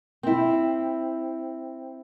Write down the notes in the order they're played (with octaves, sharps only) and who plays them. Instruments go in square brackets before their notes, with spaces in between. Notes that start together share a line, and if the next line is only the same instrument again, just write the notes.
[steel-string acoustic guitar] C4 E4